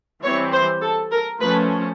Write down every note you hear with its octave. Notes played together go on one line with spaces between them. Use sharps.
E3 G3 C4 C#5
C5
A4
A#4
F3 A3 C#4 B4